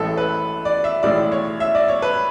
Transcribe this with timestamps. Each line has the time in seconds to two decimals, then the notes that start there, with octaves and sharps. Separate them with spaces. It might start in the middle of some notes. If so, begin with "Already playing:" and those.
Already playing: A1 A2 E3 G#3 A4
0.17 B4
0.65 D5
0.84 E5
1.03 B1 A2 E3 G#3 D5
1.32 C#5
1.60 E5
1.75 D5
1.88 C#5
2.02 B4